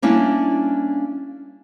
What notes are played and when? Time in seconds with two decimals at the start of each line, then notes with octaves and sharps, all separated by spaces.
0.02 G3 A#3 C#4 D4 E4